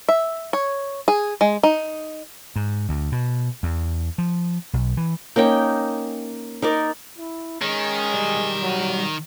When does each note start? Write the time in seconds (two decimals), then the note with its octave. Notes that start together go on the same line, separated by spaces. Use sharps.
0.09 E5
0.53 C#5
1.08 G#4
1.41 G#3
1.63 D#4
2.56 G#2
2.89 D2
3.12 B2
3.63 E2
4.18 F3
4.73 B1
4.97 E3
5.36 A#3 C#4 D#4 G5
6.62 D#4 A#4 D5
7.18 E4
7.62 D#3 G#3 C#4
8.12 B1 G3
8.62 F#3